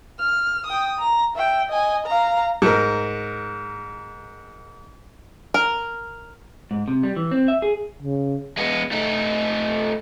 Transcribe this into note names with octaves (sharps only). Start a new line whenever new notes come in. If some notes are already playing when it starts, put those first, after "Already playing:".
F6
G5 D#6
A#5
E5 G5
D#5 G#5
F5 A#5
G#2 A#4
A#4
G#2
C3
G3
E3
C4
E5
G#4
C#3
G#3 B3
A3 D#4